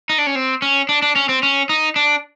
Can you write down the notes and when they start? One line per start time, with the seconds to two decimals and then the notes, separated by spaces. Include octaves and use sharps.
0.09 D#4
0.18 D4
0.27 C#4
0.35 C4
0.62 C#4
0.89 D4
1.02 D4
1.16 C#4
1.29 C4
1.43 C#4
1.69 D#4
1.96 D4